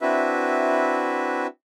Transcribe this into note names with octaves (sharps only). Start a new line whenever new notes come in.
C4 D4 E4 F#4 B4 E5